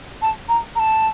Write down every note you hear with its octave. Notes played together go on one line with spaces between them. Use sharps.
A5
A#5
A#5
A5